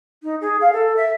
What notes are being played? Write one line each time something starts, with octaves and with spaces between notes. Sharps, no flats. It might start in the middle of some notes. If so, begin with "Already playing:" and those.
D#4
G#4
F5
A4
E5